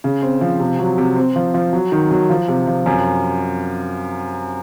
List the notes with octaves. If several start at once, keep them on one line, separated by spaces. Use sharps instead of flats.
C#3
C4
F3
C3
F#3
C3
C4
F3
F3
F#3
D#3
F#3
F3
C3
F3
F#2